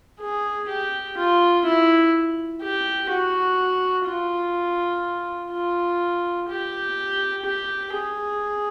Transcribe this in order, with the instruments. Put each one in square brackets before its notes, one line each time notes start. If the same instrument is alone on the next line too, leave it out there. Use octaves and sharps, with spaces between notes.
[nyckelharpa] G#4
G4
F4
E4
G4
F#4
F4
F4
G4
G4
G#4